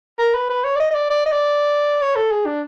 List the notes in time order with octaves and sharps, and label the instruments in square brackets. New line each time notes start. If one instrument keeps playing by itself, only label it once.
[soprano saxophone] A#4
B4
B4
C#5
D5
D#5
D#5
D5
D5
D#5
D5
C#5
A4
G#4
D4